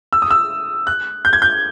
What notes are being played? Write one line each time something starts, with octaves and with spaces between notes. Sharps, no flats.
E6
D#6
E6
F#6
G6
G#6
G6